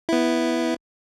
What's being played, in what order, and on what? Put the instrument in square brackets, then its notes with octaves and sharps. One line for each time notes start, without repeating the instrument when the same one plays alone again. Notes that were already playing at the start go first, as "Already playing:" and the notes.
[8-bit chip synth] B3 E4